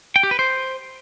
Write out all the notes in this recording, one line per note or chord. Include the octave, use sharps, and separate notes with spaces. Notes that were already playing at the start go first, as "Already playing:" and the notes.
G5
G4
B4
C5